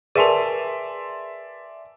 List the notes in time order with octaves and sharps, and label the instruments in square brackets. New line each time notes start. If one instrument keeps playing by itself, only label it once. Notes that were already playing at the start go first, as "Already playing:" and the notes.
[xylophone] G#4 A#4 [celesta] B4 G#5 A5 [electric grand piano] D5 E5 C6